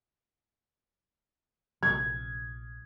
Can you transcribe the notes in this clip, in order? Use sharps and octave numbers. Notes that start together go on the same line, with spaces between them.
A#1 C3 F3 G#6